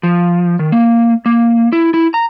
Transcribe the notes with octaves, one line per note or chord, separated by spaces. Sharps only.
F3
D#3
A#3
A#3
E4
E4
A#5